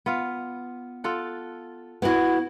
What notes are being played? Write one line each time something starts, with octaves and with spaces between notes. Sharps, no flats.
B3 F4 F5
F4 A4 F#5
B3 E4 F#4